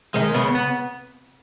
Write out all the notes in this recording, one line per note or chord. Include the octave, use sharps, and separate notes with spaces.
D#3 G#3
C#3 B3
B3